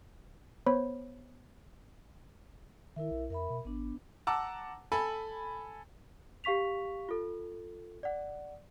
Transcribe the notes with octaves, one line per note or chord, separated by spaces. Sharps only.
B3 C5 C#5 B5
D#3 E4 A#4 E5
B1
F2 A#4 E5 B5
B2
G#1 B3 D4
F#5 A5 A#5 D6 E6
A4 G#5 B5
G4 F5 C#6 B6 F7
F4 A4
D5 F#5